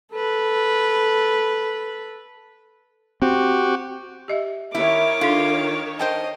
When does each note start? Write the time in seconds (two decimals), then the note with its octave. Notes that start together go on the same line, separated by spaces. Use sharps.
0.13 A4 B4
3.22 C4 F#4 G4
4.28 G4 D#5 E5
4.75 D#3 E4 C#5 D6
5.21 D4 F4 A4
5.99 C5 D#5 G5 A5